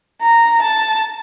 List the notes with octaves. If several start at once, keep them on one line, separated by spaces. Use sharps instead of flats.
A#5
A5